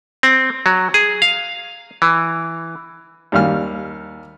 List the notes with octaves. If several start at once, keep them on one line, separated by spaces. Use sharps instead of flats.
C4
F#3
G#4
F5
E3
D#2 G3 F5 F6